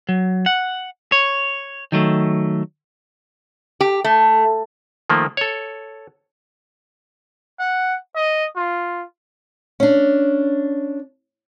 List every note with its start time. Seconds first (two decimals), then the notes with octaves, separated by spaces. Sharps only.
0.09 F#3
0.46 F#5
1.12 C#5
1.92 D#3 F#3 A3
3.81 G4
4.04 A3
5.10 D#3 F3 A3 A#3
5.37 A4 C#5
7.59 F#5
8.16 D#5
8.56 F4
9.80 C#4 D4